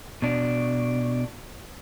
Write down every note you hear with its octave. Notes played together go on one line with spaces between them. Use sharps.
B2 D4